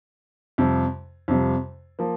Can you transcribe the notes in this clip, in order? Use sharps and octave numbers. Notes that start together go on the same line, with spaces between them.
F2 C3 G3
F2 C3 G3
F3 A#3